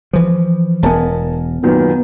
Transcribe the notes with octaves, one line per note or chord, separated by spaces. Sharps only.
E3 F3
E1 B3 A#4 G#5 A5
F#2 A#2 D#3 B3